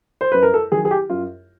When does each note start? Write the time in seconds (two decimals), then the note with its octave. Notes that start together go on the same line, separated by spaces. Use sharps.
0.21 C5
0.32 F#2 B4
0.43 A#4
0.54 A4
0.72 D#3 F#3 G#4
0.85 G#4
0.91 G4
1.10 F#2 F4